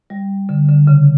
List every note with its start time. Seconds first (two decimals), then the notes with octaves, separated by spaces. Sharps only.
0.10 G3
0.49 D3
0.69 D3
0.87 C#3